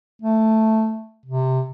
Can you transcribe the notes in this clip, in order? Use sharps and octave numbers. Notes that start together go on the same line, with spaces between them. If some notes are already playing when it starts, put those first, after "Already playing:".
A3
C3